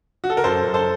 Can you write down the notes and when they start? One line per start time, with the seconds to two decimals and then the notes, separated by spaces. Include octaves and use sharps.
0.24 F#4
0.30 A4
0.37 A#4
0.44 F#2 A4 C5
0.65 F#2
0.74 A4 C5